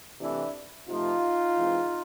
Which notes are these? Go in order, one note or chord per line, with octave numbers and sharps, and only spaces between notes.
C3 E3 A3 C4 D4 E4
C3 F3 A3 D#4 F4
E3 G#3 C4